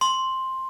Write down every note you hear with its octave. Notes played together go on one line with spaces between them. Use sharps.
C6